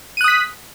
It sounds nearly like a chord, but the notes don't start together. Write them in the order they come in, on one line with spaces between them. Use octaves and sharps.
D#7 F#6 D#6 B6